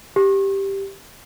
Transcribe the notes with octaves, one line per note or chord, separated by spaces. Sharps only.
G4